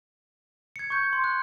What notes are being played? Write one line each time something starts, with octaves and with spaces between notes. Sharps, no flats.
G#6 C#7
C#6 G6
C6
F#6